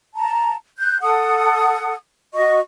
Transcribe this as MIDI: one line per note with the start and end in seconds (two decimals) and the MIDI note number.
0.16 0.54 81
0.16 0.54 82
0.79 0.97 90
0.79 0.97 91
1.01 1.94 69
1.01 1.94 78
1.01 1.94 87
2.34 2.60 66
2.34 2.60 75
2.34 2.60 85